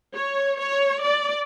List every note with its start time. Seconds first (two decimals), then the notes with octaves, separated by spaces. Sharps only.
0.15 C#5
0.59 C#5
1.03 D5